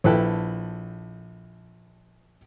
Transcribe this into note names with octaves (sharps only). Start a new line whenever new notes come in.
A#1 E4 A4 B4 G5